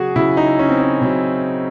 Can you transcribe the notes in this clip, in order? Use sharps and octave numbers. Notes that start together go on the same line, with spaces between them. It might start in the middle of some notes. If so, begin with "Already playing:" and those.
Already playing: C#3 F#3 F#4 G#4
C#3 F#3 E4
D#4
C#4
C4
C#4
C#3 F#3 C4